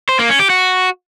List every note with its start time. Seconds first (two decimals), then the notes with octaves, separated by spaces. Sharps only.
0.09 C5
0.19 A#3
0.29 C#4
0.39 G4
0.50 F#4